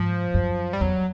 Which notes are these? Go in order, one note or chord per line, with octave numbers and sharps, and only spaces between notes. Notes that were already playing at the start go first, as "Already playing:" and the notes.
Already playing: G#2 F3
F#2
G3
E2 F#3